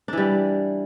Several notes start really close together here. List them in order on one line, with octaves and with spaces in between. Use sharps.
D4 E3 G3